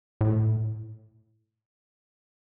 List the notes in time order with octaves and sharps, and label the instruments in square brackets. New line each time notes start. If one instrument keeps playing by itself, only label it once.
[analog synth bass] A2